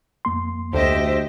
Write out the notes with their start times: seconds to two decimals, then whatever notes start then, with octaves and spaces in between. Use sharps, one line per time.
0.25 F2 A#3 C6
0.73 D2 G4 C5 D#5 E5